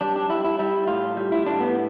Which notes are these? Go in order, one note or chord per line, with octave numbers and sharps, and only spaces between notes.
G3 D4
D4
G3 E4
E4
G3 E4
A2 F4
G3
E4
A2 D4
B3